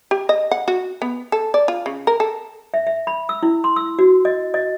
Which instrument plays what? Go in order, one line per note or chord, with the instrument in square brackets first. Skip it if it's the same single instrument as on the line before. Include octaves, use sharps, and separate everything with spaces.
[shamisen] G4
D#5
F#5
F#4
B3
A4
D5
F4
C#3
A#4
A4
[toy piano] E5
E5
B5
E6
E4
C6
E6
F#4
D#5
D#5